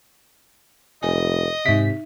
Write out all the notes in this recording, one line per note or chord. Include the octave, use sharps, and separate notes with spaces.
F1 D#5 G#5
G#2 C3 D#4 E5 B6